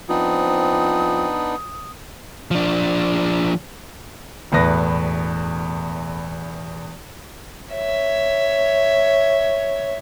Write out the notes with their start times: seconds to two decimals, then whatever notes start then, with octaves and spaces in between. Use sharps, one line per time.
0.09 F3 B3 C4 D4 D#4 D#6
2.51 F3 D4
4.52 E1 E2 A2 B4 A#6
7.73 C#5 E5